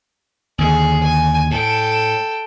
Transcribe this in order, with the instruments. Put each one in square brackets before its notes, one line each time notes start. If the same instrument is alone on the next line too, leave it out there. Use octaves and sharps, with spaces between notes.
[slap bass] D#2 D3 [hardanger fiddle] G#4
[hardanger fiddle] G#5
[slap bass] A2 [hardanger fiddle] A4 G5